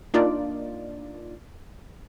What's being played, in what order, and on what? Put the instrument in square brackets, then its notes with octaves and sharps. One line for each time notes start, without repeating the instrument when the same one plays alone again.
[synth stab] A#3 D4 D#4 F4 D5